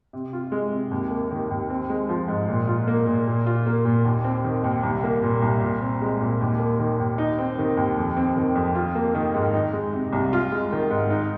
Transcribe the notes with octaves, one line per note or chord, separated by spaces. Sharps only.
C3
F4
G#3
C3
D#2
A#3
D#3
D#2
C4
G#3
F3
G#2
A#2
F4
A#3
A#2
A#2
F4
A#3
A#2
D#2
C4
D#3
D#2
C2
A#3
A#2
C2
A#2
C4
G#3
A#2
D#2
A#3
D#3
D#2
D#4
C4
D#3
D#2
F2
C4
D#3
F2
F4
A#3
D#3
G#2
D#4
G#3
C3
C2
F4
G#3
D#3
G#2
D#4